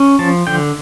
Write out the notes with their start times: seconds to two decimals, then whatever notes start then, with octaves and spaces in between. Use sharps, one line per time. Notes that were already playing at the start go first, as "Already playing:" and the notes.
Already playing: C#4
0.19 F3 A5
0.47 D3 G5